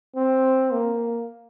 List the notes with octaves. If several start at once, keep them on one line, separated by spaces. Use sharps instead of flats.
C4
A#3